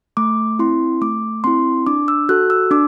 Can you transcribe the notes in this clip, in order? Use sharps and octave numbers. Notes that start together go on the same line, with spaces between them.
A3 D6
C4 E4 C6
A3 D6
C4 E4 C6
D4 D6
E6
F#4 A4 F#6
E6
D4 D6